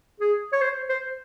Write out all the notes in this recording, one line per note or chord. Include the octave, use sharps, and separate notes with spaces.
G#4
C#5
C5
C5